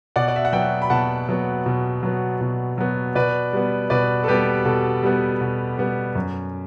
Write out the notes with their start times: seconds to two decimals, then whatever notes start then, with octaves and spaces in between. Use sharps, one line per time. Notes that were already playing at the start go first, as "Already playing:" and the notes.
0.16 B2 D5 F#5
0.28 D5
0.36 E5
0.45 F#5
0.52 F#3 B3 E5 G5
0.82 B5
0.90 B2 F#5 A5
1.29 F#3 B3
1.66 B2
2.03 F#3 B3
2.41 B2
2.78 F#3 B3
3.15 B2 B4 D5
3.53 G3 B3
3.90 B2 B4 D5
4.24 A4
4.28 G3 B3 G4 B4
4.65 B2 A4
5.03 G3 B3
5.41 B2
5.78 G3 B3
6.15 F#2